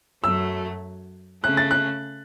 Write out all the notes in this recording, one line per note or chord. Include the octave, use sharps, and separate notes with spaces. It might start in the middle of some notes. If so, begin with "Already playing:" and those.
F#2 F#3 A3 E6
C#3 A3 C#4 F#6
A6
F#6